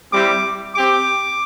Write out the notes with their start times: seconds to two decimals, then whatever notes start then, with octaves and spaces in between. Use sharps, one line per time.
0.12 G3 C4 E4 G4 D6
0.74 C4 G4 D6